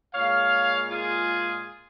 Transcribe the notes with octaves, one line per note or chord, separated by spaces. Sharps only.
A#2 G#3 C#5 F5
F4 G#4